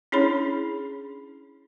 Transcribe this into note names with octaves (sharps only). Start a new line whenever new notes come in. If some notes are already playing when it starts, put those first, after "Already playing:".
C#4 D4 E4 G#4 C#5 B5